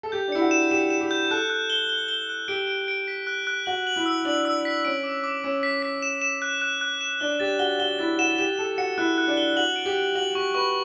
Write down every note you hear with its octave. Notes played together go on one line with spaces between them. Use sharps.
A4
G4 G6
D4
E4 C#7
F#4
E7
G4 E7
E7
G4
G6
A4 F#6
F#6
G7
G7
G7
F#6
G4 D7
D7
D7
B6
F#6
F#6
F#4 F#7
F#7
E4
E6
D4 F#7
E6
B6
C#4 D7
D6
D6
C#4 D7
B6
B6
E7
E7
F#6
F#6
F#6
E7
D4 G7
G4 A6
F#4 G7
F#4 G7
E4 A6
F#4 E7
G4 E7
A4 E7
F#4 C#7
E4 F#6
F#6
D4
G7
F#4 F#7
D7
G4
D7
F#4 F#7
G4 C#6
B4 C#6